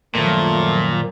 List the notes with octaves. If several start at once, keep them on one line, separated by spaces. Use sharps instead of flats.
F#2 A#2 D#3 F3 F#3 A3